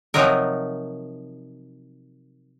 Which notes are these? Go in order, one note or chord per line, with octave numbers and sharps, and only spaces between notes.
C3 F3 F#3 D#4 A#4